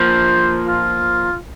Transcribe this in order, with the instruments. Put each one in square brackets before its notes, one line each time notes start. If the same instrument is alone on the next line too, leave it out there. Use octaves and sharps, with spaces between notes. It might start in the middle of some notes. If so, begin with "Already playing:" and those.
Already playing: [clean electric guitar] F3 A#3 [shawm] C5
[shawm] F4